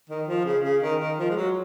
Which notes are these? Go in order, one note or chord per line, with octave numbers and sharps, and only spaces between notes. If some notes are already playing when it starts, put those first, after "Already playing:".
D#3
F3
C#3
C#3
D#3
D#3
F3
G#3
F#3